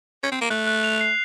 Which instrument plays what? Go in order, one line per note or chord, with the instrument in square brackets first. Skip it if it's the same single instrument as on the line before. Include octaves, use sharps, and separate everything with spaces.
[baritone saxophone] C#4
C4
A#3
[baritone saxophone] A3 [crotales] F#6
[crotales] F#6
F7
C7